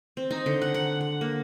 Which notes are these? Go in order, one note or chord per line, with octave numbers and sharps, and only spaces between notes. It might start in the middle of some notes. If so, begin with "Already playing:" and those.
C4
D#4
D3
F#5
F#5
F#5
A#3